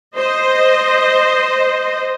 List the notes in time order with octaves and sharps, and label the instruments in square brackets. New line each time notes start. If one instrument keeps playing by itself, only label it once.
[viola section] C5 D#5